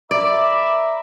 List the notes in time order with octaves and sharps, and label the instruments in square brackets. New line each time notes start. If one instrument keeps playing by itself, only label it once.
[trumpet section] A#4 E5 [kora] D5 [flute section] B5 D6